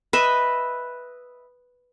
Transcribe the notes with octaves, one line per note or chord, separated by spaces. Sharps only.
B4 D#5 E5